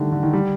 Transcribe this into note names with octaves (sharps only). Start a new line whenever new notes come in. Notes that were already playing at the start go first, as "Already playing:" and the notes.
Already playing: D3 D#3 G3 A3
D3
D#3
G3